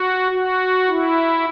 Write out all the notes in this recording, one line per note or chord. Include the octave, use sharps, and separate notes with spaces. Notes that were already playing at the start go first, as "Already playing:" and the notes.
Already playing: F#4
F#4
E4